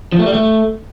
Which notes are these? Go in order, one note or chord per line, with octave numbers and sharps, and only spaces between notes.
F3
A3
G3
A3